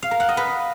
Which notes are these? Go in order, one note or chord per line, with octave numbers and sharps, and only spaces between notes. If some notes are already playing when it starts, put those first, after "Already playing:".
F5
A#4
F#5
D#5
B4